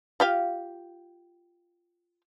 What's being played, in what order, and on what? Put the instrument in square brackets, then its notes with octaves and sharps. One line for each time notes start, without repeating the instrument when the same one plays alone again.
[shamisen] F4 G4 F5